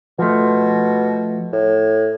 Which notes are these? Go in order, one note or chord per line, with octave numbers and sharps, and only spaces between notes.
B2 F3 A3
A2